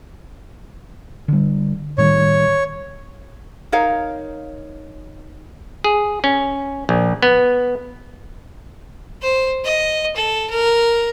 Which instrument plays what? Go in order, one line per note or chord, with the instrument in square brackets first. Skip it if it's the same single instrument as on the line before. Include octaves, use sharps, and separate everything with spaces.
[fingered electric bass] D3 G3
[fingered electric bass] A2 D#3 G3 [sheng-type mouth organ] C#5
[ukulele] D#4 A#4 C#5 F5
[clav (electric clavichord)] G#4
C#4
A#1
B3
[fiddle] C5
D#5
A4
A#4